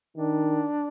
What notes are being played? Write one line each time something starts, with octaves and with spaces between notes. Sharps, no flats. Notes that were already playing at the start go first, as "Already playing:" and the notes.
D#3 D4